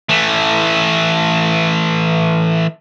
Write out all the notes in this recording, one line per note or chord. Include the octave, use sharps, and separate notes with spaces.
E3 A3